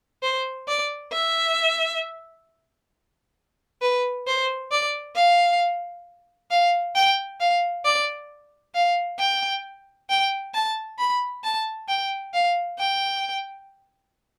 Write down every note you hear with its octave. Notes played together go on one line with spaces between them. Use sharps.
C5
D5
E5
B4
C5
D5
F5
F5
G5
F5
D5
F5
G5
G5
A5
B5
A5
G5
F5
G5